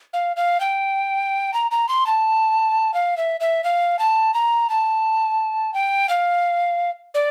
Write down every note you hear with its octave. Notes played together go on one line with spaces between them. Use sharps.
F5
F5
G5
A#5
A#5
C6
A5
F5
E5
E5
F5
A5
A#5
A5
G5
F5
D5